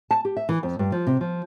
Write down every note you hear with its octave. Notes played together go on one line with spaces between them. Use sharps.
A5
G4
E5
E3
F2
G2
F3
C3
F3